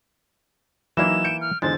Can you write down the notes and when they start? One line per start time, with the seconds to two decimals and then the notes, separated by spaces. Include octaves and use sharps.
0.97 E3 F#3 A#3 D#4 E4 E7
1.24 G6 C#7 D7
1.41 F6
1.62 E2 D3 G#3 C5 A6